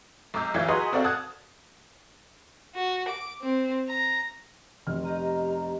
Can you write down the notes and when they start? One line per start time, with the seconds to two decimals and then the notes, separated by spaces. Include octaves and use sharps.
0.34 B1 A#5 D6 E6 G6
0.54 B1 E3 F#3 F4 E5 G#6
0.68 F#4 G#4 B4 D#5 A#5 C6
0.93 C4 F#4 A4 D5 F5
1.04 F#5 A5 D#6 F6 F#6 G#6
2.76 F#4
3.09 D6
3.42 C4
3.88 A#5
4.87 F1 F6
5.05 B3 G4 D#5 A#5